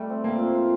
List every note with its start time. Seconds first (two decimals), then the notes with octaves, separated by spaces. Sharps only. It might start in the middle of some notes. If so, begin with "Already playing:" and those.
Already playing: G3 A3
0.10 C4
0.24 F3 A#3
0.39 C4
0.55 F4